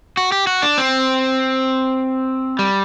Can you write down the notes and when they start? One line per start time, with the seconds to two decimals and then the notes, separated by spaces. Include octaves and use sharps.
0.17 F#4
0.32 G4
0.47 F#4
0.62 D4
0.78 C4
2.59 G3